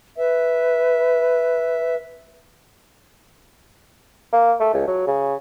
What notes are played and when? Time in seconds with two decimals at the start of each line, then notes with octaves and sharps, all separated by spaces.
0.18 B4 E5
4.32 A#3
4.60 A3
4.74 C#2
4.87 F#3
5.07 C#3